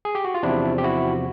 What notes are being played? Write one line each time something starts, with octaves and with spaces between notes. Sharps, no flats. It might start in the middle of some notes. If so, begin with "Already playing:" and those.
G#4
G4
F#4
F4
E2 C3 F3 D4 E4
G4
E4 F#4